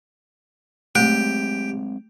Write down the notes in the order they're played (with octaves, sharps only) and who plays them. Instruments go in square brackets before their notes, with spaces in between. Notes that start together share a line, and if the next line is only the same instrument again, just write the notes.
[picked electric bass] F#3 G#3 C4 [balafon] A3 [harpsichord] G4